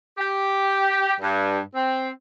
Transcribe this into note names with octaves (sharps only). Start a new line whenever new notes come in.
G4
G2
C4